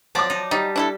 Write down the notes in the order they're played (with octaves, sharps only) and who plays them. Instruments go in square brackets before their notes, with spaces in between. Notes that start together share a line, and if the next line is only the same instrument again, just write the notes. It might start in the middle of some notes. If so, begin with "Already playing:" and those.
[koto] F3 F#3 D5 [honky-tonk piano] A5 D6
[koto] D#4
[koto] G3 [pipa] D#4
[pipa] D4 E4 A4